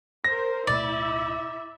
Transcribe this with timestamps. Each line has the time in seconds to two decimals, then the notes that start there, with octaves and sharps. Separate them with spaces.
0.24 A#4 C5 A#6
0.67 D1 B2 A3 E4 D5 E5